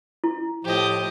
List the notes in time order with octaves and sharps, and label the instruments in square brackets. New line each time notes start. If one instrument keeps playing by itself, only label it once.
[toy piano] E4
[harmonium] A2 F3 [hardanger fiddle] G4 D#5